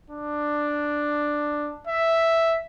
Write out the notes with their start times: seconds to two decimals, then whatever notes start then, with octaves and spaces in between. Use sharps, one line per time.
0.10 D4
1.87 E5